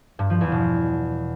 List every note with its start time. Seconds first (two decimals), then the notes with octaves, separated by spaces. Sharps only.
0.19 G2
0.30 F3
0.41 E2
0.52 B2